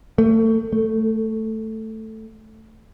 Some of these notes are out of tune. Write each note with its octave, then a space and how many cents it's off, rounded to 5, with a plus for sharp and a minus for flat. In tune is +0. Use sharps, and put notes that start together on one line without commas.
A3 +30
A3 +5